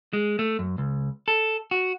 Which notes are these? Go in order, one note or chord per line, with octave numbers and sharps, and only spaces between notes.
G#3
A3
F#2
C#2
A4
F#4